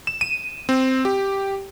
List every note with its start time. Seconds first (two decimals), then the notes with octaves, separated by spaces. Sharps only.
0.07 E7
0.21 D#7
0.69 C4
1.05 G4